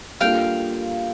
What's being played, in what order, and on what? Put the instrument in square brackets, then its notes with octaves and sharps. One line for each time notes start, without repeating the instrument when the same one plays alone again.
[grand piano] G3 A#3 D4 F4 A4 [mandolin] F5 G5